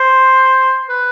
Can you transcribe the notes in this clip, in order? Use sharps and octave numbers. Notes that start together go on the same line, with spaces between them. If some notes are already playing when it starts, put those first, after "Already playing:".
Already playing: C5
B4